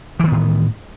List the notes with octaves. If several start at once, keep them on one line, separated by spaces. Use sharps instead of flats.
A2 D#3 E3 B3